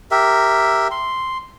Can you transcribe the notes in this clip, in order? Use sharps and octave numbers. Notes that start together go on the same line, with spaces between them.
G4 A#4 E5
C6